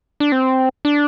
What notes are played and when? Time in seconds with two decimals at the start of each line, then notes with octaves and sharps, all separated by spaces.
0.20 D4
0.32 C4
0.85 D4